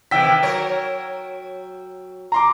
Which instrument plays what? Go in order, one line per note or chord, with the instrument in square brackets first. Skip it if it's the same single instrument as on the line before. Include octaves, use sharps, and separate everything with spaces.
[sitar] C3 D#3 E3 [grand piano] G5 E6 B6
[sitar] F#3 A#4 C#5
[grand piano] A#5 C6 D6